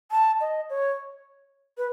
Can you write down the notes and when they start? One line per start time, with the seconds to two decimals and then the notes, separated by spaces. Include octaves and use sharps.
0.11 A5
0.41 D#5
0.70 C#5
1.77 B4